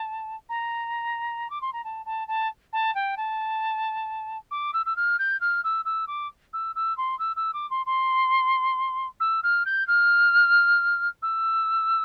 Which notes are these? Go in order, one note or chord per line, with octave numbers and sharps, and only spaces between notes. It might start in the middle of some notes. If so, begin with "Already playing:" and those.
Already playing: A5
A#5
D6
C6
A#5
A5
A5
A5
A5
G5
A5
D6
E6
E6
F6
G6
F6
E6
E6
D6
E6
E6
C6
E6
E6
D6
C6
C6
E6
F6
G6
F6
E6